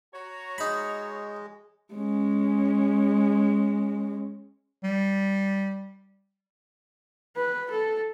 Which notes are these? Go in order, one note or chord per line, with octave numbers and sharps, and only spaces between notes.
F#4 C#5 A#5
G#3 D#4 B5
G#3 C#4
G3
B4
A4